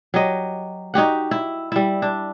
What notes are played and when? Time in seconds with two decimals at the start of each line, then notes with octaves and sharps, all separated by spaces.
0.14 F#3 G4 D#5
0.94 D#4 F#4 G4 F#5
1.31 E4
1.72 G3 E4
2.02 D4